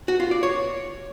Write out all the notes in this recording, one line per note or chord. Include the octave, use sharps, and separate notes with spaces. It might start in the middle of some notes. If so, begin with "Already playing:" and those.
F#4
F4
D5
C#5